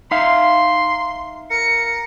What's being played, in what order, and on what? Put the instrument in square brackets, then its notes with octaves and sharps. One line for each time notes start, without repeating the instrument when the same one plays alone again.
[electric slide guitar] D#4 E5 F5 [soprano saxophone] C6
[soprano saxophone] A#4 [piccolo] C#7